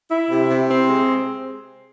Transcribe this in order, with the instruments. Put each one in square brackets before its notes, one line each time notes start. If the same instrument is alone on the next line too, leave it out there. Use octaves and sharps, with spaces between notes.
[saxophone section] E4
C3
C3
C4
G#3